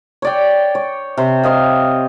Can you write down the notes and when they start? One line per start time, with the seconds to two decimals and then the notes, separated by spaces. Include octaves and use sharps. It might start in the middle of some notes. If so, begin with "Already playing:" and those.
0.22 C#5 D5 G5
0.75 C#5
1.18 C3 C5
1.44 C5 D#5 F5